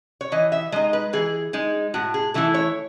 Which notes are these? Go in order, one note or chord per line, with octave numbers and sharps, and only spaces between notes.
C#5
E3 D#5
E5
G#3 D#4 D#5
B4
E3 G#4
G#3 D#4
A2 F#4
G#4
E3 A3 E4 A4
C#5